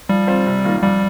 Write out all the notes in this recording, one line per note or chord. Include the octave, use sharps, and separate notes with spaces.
F3 G3
C4 F4 C5
C3
D#3 A#3 F4
F2 G3